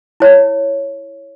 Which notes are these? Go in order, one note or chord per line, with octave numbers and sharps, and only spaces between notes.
E4 C#5